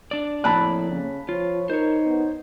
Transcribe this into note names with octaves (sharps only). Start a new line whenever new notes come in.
D4 D5
F2 A2 A#3 D5 A5 B5 F#6
C#3
F3 F4 C#5
D#4 A#4 C5 C#5
B3